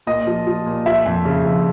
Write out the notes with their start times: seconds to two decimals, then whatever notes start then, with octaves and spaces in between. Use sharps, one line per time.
0.07 A#2 D#5
0.27 F3
0.47 F3
0.66 A#2
0.86 F3 E5
1.06 F2
1.25 C#3
1.45 F2